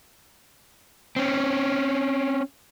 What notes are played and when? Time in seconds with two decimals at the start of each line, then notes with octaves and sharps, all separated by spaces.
1.16 C4 C#4